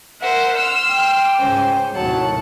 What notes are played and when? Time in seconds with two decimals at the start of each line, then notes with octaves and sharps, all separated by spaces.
0.21 A#4 C5 E5 F#5
0.56 C6 E6 F6
0.88 G5 D6
1.37 C#2 G#2 C#4 C5
1.95 D#2 A2 C3 F#3 F#5 A5